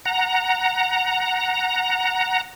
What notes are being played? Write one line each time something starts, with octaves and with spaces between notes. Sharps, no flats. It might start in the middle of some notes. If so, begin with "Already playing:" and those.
F#5 A#5